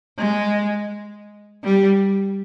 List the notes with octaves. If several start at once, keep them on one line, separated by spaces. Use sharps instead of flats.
G#3
G3